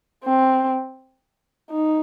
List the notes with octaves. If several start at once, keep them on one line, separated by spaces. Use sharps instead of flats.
C4
D#4